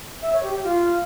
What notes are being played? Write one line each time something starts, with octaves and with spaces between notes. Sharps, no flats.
E5
C#5
G4
G4
F4